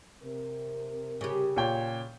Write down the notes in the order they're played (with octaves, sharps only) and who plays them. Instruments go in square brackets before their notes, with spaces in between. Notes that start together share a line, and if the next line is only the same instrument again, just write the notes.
[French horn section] C3 A#4
[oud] C#3 G4
[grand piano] A#2 C#5 G5